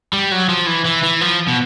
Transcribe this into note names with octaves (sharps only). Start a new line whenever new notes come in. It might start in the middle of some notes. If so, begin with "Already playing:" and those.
G3
F#3
F3
E3
E3
E3
F3
B2